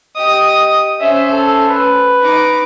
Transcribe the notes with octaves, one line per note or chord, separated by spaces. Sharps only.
G4 D#5 D#6
C#4 C5 E5
A4
B4
D#4 D6